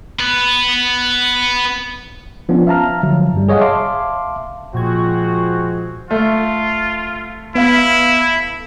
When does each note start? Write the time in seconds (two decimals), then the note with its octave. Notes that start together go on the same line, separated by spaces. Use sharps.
0.20 B3 B4
2.49 F3 B3 C#4 D4 F4
2.67 E5 F5 A5 A#5 F6
3.03 D3 F3 F#3
3.34 G2 G3
3.49 G#4 C#5 D#5 F5 F#5
3.61 E5 F5 A5 C6 D6
4.74 A#2 F3 G#3 C4 F#4 G#6
6.11 A3 F4
7.55 B3 E4 F5